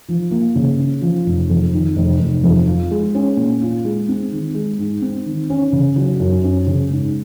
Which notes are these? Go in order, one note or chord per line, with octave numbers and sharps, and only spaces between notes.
F3
A#3
C#3
C#4
F3
F1
F2
D#3
F1
F1
F2
F4
G#3
C#4
A#2
F4
G#3
C4
D#3
G#3
G#2
C4
D#3
C#4
C#3
F#3
F#2
C#4
C#3
G#2